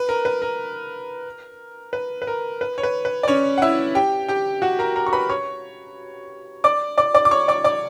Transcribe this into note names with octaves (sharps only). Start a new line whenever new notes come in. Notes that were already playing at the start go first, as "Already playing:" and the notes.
Already playing: B4
A#4
B4
A#4
B4
B4
A#4
B4
C#5
B4
B4
D5
C#4 C#5
F#5
E4 E5
G4 G5
G4 G5
F#4 F#5
A#4 A#5
A#4 A#5
C#6
B4 B5
C#5 C#6
D5 D6
D5 D6
D5 D6
D6
C#5 C#6
D5 D6
D5 D6